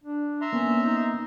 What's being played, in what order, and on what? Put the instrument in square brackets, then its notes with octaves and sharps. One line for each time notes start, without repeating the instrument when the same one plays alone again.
[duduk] D4
[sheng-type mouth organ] E5 A#5 C6
[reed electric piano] A#3 B3 [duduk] C#4
[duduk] D#4